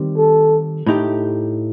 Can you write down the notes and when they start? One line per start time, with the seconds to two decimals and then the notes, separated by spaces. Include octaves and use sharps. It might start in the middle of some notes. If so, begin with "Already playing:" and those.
Already playing: D#3 G3 C4
0.18 A4
0.87 A2 A3 D#4 G4